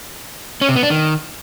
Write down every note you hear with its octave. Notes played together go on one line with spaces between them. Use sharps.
C#4
C3
B3
D4
D#3